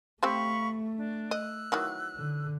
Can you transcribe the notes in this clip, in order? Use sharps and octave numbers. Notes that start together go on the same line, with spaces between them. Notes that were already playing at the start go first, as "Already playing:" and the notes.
A3 C4 G4 C5 F5 B5 C#6
D4
D#5 E6 F#6
D#3 E3 F#3
D3